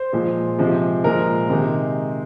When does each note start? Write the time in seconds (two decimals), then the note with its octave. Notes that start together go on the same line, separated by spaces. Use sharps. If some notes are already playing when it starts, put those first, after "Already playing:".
Already playing: C5
0.13 A#2 F3 G#3
0.58 C3 F3 G#3
1.04 A#2 F3 G#3 A#4
1.50 C3 D#3 G#3